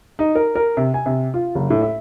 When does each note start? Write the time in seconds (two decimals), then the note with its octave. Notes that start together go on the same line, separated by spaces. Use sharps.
0.19 D#4
0.35 A#4
0.56 A#4
0.77 C3
0.94 G#5
1.06 C3
1.34 F4
1.55 F#1
1.70 A2
1.82 E5